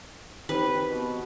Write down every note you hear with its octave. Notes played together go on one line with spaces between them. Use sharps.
D#3 C4 G4 B4
B2